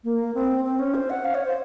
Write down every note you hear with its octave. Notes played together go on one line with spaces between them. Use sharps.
A#3
C4
C4
C#4
C5
F#5
F5
C#5
C5